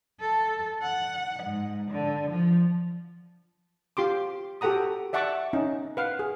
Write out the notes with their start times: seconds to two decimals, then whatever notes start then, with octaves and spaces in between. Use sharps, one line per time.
0.20 A4
0.82 F#5
1.43 G#2
1.91 D3
2.30 F3
3.97 F4 G4 C6 D6
4.61 F#4 G4 A4 F#5 A#5 D#6
5.13 D5 E5 F#5 A5 C#6 D6
5.53 C#4 D#4
5.97 B4 F5 F#5
6.19 G#4